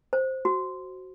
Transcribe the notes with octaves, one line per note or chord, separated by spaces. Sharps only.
C5
F#4